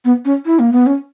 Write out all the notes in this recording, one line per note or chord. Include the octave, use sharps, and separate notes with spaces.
B3
C#4
E4
A#3
B3
C#4